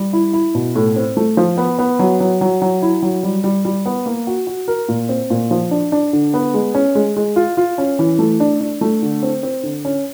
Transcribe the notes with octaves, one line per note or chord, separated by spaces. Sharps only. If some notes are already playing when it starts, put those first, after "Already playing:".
Already playing: G3
E4
E4
B2
A2
C4
A3
F3
B3
B3
F#3
F#3
F#3
F#3
E4
F#3
G3
G3
G3
B3
A#3
F#4
F#4
A#4
A#2
C4
A#2
F3
D4
D4
D3
B3
G#3
C#4
G#3
G#3
F4
F4
C#4
E3
A3
D4
D4
A3
D3
C4
C4
D3
C#4